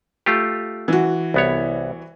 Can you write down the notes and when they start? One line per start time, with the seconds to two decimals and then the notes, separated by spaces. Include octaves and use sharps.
0.26 A3 F4 G4
0.88 E3 F#4
1.34 C2 B3 C#5